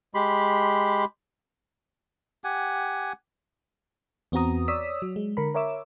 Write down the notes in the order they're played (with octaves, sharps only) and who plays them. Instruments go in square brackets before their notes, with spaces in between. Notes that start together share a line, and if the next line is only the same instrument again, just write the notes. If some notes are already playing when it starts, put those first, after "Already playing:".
[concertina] G#3 G4 B5 C6
[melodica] G4 F#5 G#5
[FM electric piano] E2 B3 C4 F#4 A#5 D#6
C#5 D5 D#6 E6 B6
F#3
G#3
D3 A#4 B5
A#4 C#5 E5 D6 E6